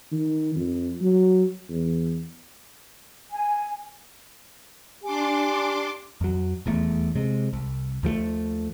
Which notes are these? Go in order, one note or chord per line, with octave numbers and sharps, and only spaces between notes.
D#3
F2
F#3
E2
G#5
D4 G4 G#5 C6 D6
F2 F#3
D#1 E2 A3
C3 G#3
C2
D#2 F3 F#3 A3